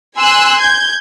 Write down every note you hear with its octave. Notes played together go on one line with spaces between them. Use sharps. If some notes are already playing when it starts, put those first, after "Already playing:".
G#5 C6 E6 F#6
G6 G#6